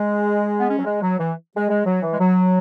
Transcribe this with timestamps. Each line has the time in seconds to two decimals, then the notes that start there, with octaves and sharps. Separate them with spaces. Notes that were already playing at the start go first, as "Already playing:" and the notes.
Already playing: G#3
0.59 B3
0.69 C#4
0.79 F#3
0.85 G#3
1.02 F#3
1.19 E3
1.56 G#3
1.69 G#3
1.85 F#3
2.02 E3
2.12 G#3
2.19 F#3